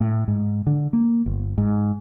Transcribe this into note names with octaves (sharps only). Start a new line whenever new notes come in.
A2
G#2
D3
A#3
G1
G#2